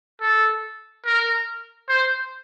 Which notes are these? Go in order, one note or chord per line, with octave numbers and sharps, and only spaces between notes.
A4
A#4
C5